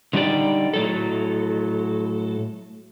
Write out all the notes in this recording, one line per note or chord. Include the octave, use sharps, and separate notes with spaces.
D3 G3 D#4 G4 D5
A2 F#3 A4